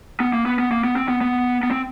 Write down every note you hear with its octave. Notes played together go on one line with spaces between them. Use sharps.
B3
A#3
B3
B3
A#3
B3
C4
B3
B3
B3
C4